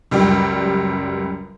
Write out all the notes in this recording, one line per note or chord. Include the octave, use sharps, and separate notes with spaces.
C#2 F#2 G3 G4